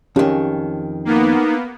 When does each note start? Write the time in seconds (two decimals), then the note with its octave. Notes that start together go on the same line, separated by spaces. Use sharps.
0.16 F2 D#3 C#4 G4
1.05 A#3 B3 D#4